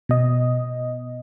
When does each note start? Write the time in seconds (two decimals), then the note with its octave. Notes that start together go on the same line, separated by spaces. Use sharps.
0.09 B2 D#5